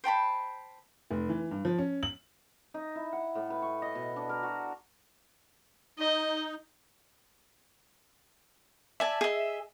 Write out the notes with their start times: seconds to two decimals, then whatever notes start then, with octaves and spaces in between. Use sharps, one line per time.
0.04 C5 G5 A5 B5
1.11 F1
1.29 E3
1.51 G2
1.65 F3
1.78 C#4
2.03 F#7
2.74 D#4
2.96 E4
3.13 F#5
3.35 A2
3.50 B4
3.62 C#6
3.82 D#5
3.95 B2
4.16 D4
4.29 A#4
4.43 F#4
5.99 D#4 D#5
9.00 D5 E5 G#5 A5
9.21 G#4 D#5